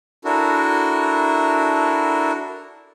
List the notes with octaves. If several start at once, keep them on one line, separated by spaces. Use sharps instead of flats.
D4 E4 F#4 A4 A#4